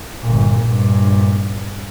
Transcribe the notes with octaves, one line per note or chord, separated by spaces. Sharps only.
G1 A#2
A#1 G2